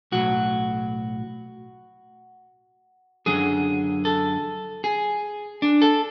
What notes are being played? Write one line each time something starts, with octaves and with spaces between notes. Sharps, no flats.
B1 A2 F#3 F#4
F#2 D3 F#3 G#4
A4
G#4
D4
A4